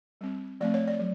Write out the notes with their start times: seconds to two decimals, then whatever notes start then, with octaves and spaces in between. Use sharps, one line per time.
0.21 G3 C4
0.61 F3 A3 C4 D5
0.74 C#5
0.87 D5
0.99 F#3